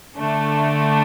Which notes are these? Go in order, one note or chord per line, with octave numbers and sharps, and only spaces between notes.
D3 A3 D4